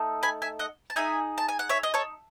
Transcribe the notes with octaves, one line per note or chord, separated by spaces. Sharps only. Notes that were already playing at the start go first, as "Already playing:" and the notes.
Already playing: A3 D#4 A4
G#5 B5
E5 G#5
D#5 F#5
A5
D#4 G#4 E5 G#5
A5
G#5
F#5
C#5 E5
D#5
A4 C#5